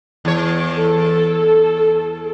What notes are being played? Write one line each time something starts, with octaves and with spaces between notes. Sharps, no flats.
E2 C#5
A4